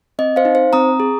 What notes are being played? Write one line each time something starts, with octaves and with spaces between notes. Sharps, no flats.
C4 D#5
C5 F5
D#4
C5
C4 A#5 D#6
G#4